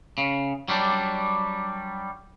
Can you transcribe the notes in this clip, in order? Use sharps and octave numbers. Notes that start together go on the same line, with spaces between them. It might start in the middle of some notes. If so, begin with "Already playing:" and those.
C#3
F#3 G3 D4